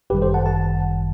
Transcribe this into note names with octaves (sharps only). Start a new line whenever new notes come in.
G1 F#2 D#3 G3 G4 B4
A4 C5
F#5 A5
F#5 A5